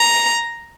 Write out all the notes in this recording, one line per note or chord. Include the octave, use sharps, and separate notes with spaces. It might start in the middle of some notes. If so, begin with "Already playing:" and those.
Already playing: A#5